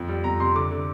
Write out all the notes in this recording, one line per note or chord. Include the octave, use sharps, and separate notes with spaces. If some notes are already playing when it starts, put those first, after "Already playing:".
Already playing: F2
G3
F2 A#5
C3 C6
D3 D6
D3